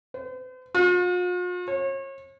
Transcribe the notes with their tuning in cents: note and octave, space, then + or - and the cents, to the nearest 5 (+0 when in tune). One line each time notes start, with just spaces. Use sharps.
C5 -45
F4 +45
C#5 -35